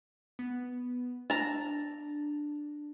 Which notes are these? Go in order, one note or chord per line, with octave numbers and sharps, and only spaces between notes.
B3
D4 A5 A#5